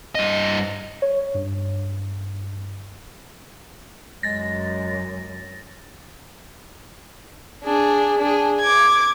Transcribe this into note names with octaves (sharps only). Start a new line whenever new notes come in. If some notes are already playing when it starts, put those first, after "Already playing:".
G2 D#5
C#5
G2
F#2 G#3 A6 A#6
D4 G#4
D4 G#4
D6 G#6